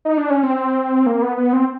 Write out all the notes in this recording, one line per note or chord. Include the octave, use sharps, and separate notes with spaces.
D#4
D4
C#4
C4
A#3
B3
B3
C4